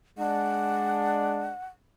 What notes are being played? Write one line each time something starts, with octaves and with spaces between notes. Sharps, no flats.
G#3 D4 F#5